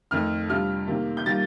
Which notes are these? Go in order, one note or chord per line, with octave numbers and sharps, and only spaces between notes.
F2 D#3 A3 F6
C3 G3 D4 F4 F6
C3 D#3 A#3
G6
D#3 G3 A#3 F4 A6